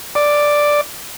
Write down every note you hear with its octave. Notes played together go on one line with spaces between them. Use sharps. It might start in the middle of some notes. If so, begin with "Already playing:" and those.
D5